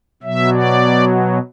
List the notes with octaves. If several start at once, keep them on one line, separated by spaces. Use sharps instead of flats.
B2 F#3 E5
D5